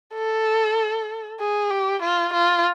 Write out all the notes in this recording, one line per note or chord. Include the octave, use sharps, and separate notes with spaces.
A4
G#4
G4
F4
F4